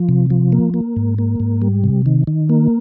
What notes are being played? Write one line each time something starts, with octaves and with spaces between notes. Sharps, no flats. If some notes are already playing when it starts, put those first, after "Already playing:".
Already playing: F3
C3
F3
A#3
A#3
G#2
A#3
G#2
G3
C3
D#3
D#3
A#3